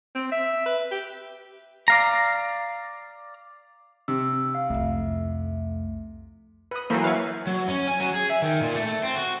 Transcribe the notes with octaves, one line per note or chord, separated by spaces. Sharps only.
C4
E5
B4
G4
D5 F5 A#5
C3 E6
F5
C2 F2 A3
B4 D#6
E3 F#3 A#3 A4 A#4 C5
B4 C#5 F5 C#6
F#3
C#4
G#5
F#3
G#4
E5
D#3
A#2
A3
A3
C4
F#4